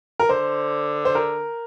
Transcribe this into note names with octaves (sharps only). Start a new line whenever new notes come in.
A#4
D3 C5
C5
A#4